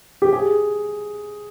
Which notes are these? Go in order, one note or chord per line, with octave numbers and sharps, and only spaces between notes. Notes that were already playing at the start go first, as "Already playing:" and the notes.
G4
G#4